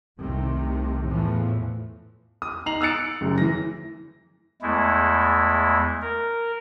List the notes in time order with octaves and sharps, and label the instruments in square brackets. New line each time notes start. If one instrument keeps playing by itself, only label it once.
[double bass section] C2 C3 D#3 A3
E2 A2 E3 F3 A3
[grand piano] D#6
D#4 A#5 C7 F7 F#7
D#6 E6 F#6 A6 C#7 D7
F#1 F#2
E3 A#6
[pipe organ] E2 G#3 A3 E4
A#4